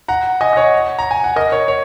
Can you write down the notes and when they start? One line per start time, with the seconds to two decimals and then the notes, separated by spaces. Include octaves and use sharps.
0.08 F#5 A#5
0.41 D#5 G#5
0.53 D#5
0.56 C#5 F#5
0.99 A#5
1.11 G#5
1.24 F#5
1.36 A#4 D#5
1.52 C#5
1.68 C#5